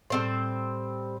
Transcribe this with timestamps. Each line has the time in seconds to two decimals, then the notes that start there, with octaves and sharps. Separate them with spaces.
0.10 A2 G3 C4 C5 A5